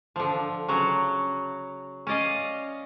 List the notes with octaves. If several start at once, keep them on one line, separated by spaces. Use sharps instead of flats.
D3 F3
C#3 F#3 F#4
C#4 D5 D#5 F5